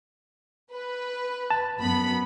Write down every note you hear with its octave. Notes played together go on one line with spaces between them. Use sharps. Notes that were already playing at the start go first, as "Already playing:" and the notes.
B4
A5
F#2 B3 B5